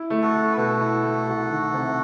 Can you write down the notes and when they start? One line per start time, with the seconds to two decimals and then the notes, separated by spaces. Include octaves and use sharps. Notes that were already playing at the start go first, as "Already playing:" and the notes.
Already playing: E4
0.10 A3
0.22 F#4 A4
0.34 A3
0.53 B4
0.57 B2 F#4 A4
0.80 E4
1.04 A3
1.27 C2
1.50 D#3
1.74 C3